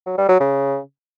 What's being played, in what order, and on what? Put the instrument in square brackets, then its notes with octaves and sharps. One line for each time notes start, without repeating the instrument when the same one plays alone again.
[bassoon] F#3
G3
F#3
C#3